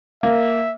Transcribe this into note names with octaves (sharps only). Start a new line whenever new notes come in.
A#3 E5